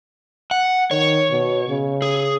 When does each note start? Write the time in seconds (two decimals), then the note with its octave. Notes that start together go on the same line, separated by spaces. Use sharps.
0.51 F#5
0.91 D#3 C#5
1.31 B2
1.69 C#3
2.02 G#4